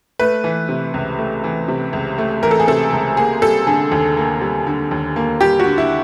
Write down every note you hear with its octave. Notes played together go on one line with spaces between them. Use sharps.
A3 B4
E3
C3
C#2
A3
E3
C3
C#2
A3
E3 A#4
A4
G#4
C3 A4
C#2
A#3 G#4
G3 A4
D3 G#4
D#2
A#3
G3
D3
D#2
A#3
G3 G4
F#4
D3
E4